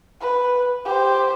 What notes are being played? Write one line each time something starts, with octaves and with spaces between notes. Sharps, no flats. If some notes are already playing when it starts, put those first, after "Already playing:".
B4
G4 C5